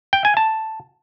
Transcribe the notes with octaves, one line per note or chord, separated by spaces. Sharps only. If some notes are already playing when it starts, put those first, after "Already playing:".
G5
G#5
A5